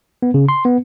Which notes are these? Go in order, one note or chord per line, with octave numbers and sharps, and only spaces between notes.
B3
C#3
C6
B3